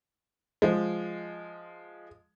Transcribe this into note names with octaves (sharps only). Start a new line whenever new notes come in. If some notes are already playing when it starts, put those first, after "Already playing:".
F3 G#3